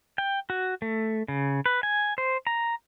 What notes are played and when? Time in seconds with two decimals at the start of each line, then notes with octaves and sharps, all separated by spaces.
0.18 G5
0.50 F#4
0.82 A3
1.28 C#3
1.66 B4
1.83 G#5
2.18 C5
2.47 A#5